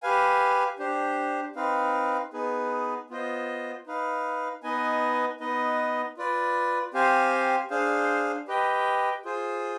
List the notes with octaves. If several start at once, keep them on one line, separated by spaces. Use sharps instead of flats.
G4 B4 F5 G#5
D4 G4 C5
C4 D#4 B4 F5
B3 D#4 G#4 B4
B3 F4 C5 D#5
D#4 B4 F5
B3 D#4 B4 D#5 G#5
B3 D#4 B4 D#5
F4 B4 D5
C4 G4 C5 F5 G#5
D4 G#4 C5 F5
G4 B4 D#5 G5
F4 G#4 C5